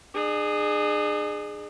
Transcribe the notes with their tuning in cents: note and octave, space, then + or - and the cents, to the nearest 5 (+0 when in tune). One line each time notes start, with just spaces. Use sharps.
D4 +45 G#4 +0